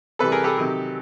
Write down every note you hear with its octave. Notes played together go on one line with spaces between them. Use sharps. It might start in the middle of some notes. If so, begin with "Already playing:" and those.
C3 E3 G3 A4 B4
G#4 A#4
G4 A4
C3 D#3 F#3